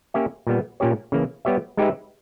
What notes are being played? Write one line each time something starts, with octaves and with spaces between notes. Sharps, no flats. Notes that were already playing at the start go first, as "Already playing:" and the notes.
A#3 C#4 G4 C#5 E5
A#2 G3 B3
A#2 A#3 C#4 G4 C#5
C#3 E3 A#3
G3 B3 G4 C#5 E5
G#3 D#4 G4 B4 E5